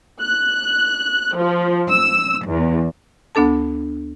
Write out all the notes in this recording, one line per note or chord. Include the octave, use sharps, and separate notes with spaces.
F#6
F3
E6
E2
D2 B3 D4 A4 A5